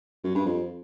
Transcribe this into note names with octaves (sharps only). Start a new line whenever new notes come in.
F#2
G2
F2